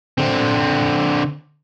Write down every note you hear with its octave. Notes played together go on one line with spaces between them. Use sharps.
D3 C4